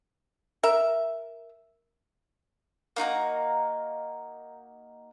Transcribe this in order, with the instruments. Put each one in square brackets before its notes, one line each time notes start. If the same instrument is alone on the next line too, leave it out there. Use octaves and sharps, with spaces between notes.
[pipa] A#4 E5
[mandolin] A#3 D#4 F#4 A#5